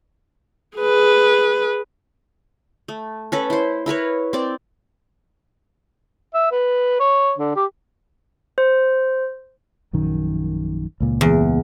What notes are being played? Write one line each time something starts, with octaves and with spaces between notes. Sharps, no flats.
G#4 B4
A3
C#4 A4 B4
E4 C5
E4 A#4 B4 C#5
C4 D5
E5
B4
C#5
D3
G4
C5
A#1 F#2 D#3
C#2 A#2
E2